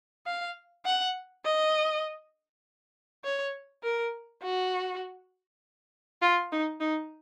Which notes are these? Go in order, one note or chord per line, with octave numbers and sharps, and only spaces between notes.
F5
F#5
D#5
C#5
A#4
F#4
F4
D#4
D#4